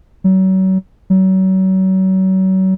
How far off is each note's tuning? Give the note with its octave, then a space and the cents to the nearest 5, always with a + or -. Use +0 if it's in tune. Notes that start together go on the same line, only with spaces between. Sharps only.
F#3 +35
F#3 +35